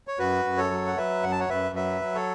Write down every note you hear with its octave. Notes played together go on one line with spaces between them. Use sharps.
C#5
F#2 F#4 B4
F#2
A4 C#5
F#3
F#5
F#3 B4 E5
F#2 F#5
A5
C#5 F#5
F#2 B4 E5
F#3 B4 E5
F#3
A4 C#5